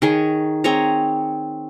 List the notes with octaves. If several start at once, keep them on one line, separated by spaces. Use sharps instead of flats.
D#3 G#4 C#5
C4 G#4 C#5 A#5